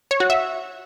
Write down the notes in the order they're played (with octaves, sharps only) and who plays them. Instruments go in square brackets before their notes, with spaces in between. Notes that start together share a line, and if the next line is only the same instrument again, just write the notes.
[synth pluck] C#5
F#4
E5